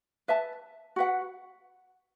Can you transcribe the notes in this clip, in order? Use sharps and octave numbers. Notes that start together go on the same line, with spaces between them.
B4 E5 A5
F#4 B4 F#5